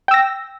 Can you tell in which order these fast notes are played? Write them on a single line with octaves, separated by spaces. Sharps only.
G5 E6 A#6